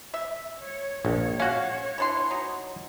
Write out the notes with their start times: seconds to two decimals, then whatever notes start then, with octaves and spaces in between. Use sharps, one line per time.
0.14 E5
0.63 C#5
1.05 A#1 C#5
1.40 C#4 F#4 F5
1.98 E3 D4 C6
2.31 F#3 D#4